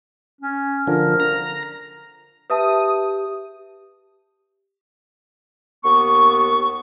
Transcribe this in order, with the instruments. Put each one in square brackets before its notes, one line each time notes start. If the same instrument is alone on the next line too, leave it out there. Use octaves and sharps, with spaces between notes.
[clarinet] C#4
[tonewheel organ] D3 F3 [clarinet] A#4
[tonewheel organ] A#5
[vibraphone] G4 [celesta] B4 E5 A5 [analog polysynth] D#6
[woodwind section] D#2 B3 C#6